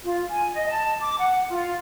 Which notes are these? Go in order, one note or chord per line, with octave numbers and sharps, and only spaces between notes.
F4
G#5
D#5
A5
D6
F#5
F4